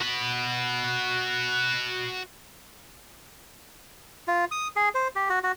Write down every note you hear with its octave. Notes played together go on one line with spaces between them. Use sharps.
F#4 B5
F4
D#6
G#4
C5
G4
F#4
F#4